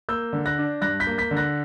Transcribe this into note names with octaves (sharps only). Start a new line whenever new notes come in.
A#3 E6 G6
D3
F#6 A#6
D4
G2 F#6 A#6
G6 B6
A#3
G6 B6
D3
F#6 A#6